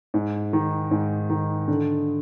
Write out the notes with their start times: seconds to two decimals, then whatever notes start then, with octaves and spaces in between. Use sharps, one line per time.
0.14 G#2
0.53 D#3
0.91 G#2
1.30 D#3
1.68 D3